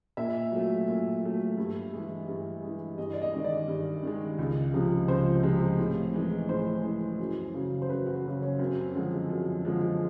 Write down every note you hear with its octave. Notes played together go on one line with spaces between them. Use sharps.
A#2 E5
F#3 A3
A#2
F#3 A3
G2
E3 G#3
G2
E3 G#3
G2 D#5
D5
D#5
D#3 G#3
D5
G2
D#3 G#3
C#2
C3 F3 G#3
C#2 C5
C3 F3 G#3
A2
E3 G#3
A2 C5
E3 G#3
F#2
C#3 F#3
C5
F#2 B4
F#4
C#3 F#3
C#4
F#2 C4
D3 F3 G#3
F#2
D3 F3 G#3